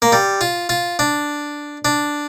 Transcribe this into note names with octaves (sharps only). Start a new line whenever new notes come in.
A#3
G3
F4
F4
D4
D4